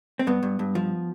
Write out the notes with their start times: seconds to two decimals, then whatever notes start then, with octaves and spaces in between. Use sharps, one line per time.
0.19 C4
0.27 G2 B3
0.43 G2
0.59 G2
0.75 F3